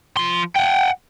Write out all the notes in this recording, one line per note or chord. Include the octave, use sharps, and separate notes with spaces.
F3 C6
F#5 G5